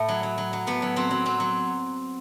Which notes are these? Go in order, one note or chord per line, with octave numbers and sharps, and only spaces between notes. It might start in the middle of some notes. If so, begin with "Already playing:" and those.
Already playing: A2 E4
F#3
F#3
F#3
F#3
A2 B3
F#3
F#3 C4
F#3
F#3 C4
F#3